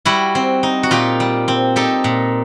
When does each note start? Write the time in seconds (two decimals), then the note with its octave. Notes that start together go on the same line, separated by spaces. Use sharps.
0.05 G3 E4 F#4
0.35 C4
0.63 D#4
0.83 F#4
0.91 A#2 F4 G4
1.20 G3
1.48 C4
1.76 D#4 G4 A4
2.04 A#2